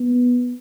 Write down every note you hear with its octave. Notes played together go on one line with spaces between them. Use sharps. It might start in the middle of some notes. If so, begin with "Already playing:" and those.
Already playing: B3